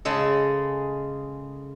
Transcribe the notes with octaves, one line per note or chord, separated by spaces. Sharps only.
C#3 G#3 A4